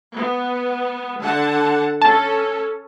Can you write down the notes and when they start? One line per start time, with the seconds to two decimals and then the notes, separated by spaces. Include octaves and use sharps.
0.15 B3
1.22 D3 F#5 A5
2.02 C#4 A4 A5